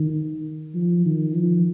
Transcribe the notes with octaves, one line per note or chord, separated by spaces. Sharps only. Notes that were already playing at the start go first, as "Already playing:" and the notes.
Already playing: D#3
F3
D#3
F3